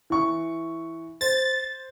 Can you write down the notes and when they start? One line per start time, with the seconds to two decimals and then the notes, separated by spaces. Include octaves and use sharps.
0.10 E3 C#6
1.21 C5 A6